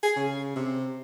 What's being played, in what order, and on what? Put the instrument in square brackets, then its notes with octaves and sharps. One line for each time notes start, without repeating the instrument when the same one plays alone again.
[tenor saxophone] G#4
C#3
C3